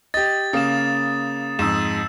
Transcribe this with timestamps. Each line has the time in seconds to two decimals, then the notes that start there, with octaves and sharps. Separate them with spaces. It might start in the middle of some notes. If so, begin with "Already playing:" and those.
0.14 G4 D#5 A6
0.53 C#3 A#3 D#6 E7
1.59 F2 G#2 E6 E7